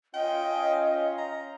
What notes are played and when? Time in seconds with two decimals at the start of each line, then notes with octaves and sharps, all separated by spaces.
0.14 C#4 F4 D#5 G5
1.18 A#5